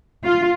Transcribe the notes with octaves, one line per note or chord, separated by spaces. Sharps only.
F4